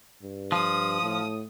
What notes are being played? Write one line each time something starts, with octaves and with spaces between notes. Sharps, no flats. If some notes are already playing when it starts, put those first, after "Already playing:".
G2
F3 D#6
A2